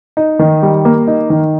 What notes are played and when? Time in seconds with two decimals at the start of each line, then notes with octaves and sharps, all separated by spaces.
0.17 D#4
0.39 D#3
0.62 G3
0.85 A#3
1.07 D#4
1.30 D#3